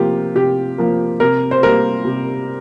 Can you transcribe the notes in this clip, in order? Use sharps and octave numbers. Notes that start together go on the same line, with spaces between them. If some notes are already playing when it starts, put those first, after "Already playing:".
Already playing: C3 F3 A#3 F4 G4
C3 G4
F3 A#3
C3 A#4
C5
G3 A#3 A#4
C3